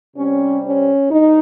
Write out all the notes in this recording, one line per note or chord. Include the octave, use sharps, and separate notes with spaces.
C3 G3 C4 C#4
C#4
G2 D#4